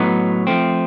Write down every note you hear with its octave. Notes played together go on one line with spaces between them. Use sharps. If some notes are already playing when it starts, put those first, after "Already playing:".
Already playing: A2 F#3 B3 D#4
F3 A3 C4